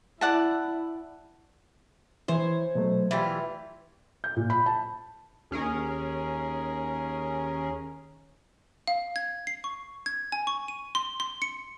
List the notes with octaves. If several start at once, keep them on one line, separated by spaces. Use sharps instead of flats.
E4 D5 F#5 A5
E3 E4 C5 C#5
B2 F#3 A3
E3 G3 F4 E5 G5
G6
A#2
B5
A5
D#2 C#4 G#4 A#4
F5
G#6
C7
C#6
G#6
G#5
C#6
D#7
C6
C6
C#7